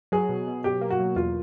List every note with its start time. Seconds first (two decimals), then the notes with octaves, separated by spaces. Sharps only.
0.12 F#3 G#4
0.29 B2
0.47 B2
0.64 B2 G4
0.81 A#3
0.90 F#4
1.00 F#3
1.16 E2 F4